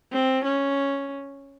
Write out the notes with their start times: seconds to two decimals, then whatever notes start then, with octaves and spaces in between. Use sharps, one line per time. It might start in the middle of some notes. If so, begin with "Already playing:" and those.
0.12 C4
0.44 C#4